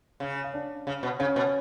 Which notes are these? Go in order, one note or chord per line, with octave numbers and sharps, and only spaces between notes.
C#3
F5
D4 D5
C#3
B2
C#3 C#4 C#5
B2